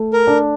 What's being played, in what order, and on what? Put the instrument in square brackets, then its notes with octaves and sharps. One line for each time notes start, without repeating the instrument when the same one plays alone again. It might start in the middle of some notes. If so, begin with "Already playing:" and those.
Already playing: [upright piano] A3
[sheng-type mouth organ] A#4
[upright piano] D4